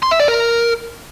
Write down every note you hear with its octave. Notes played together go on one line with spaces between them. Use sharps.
C6
E5
D5
A#4